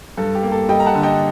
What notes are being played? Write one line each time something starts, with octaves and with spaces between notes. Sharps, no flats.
G2 A4
G4
A#3
A4
G3 D#5 G5
A#5
F#5 A5
D3
D#5 G5